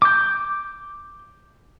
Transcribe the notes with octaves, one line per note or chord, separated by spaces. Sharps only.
D6 G6